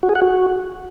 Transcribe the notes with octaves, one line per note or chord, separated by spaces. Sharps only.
F#4
G#4
F#5
F#4